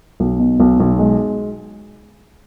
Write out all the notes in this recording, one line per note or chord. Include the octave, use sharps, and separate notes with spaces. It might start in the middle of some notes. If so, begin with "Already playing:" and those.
B1
B2
B1
B1
G#3